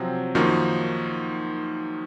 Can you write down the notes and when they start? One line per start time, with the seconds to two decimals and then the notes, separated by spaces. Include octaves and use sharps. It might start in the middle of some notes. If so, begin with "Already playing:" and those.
Already playing: C3 F3 F#3 C4
0.35 F#2 D#3 F3 A#3 D#4 F#4